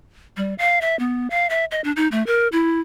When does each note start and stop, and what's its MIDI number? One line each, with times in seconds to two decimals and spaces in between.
0.37 0.54 55
0.58 0.79 77
0.81 0.97 76
0.99 1.28 59
1.30 1.47 77
1.50 1.65 76
1.71 1.81 75
1.84 1.92 62
1.96 2.08 63
2.12 2.25 57
2.26 2.48 70
2.52 2.80 64